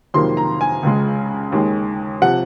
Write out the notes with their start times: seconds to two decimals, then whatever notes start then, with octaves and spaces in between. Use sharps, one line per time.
0.14 F2 C3 D#3 F#3 A#3 C6
0.37 A#5
0.61 G#5
0.83 C#2 C#3 G#3
1.52 D#2 D#3 G#3
2.22 C3 F3 F#5